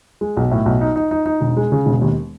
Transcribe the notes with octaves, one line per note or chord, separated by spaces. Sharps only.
G#3
B1
A2
B1
D#4
D#4
D#4
D#4
E1
G#3
C#3
E1
D#2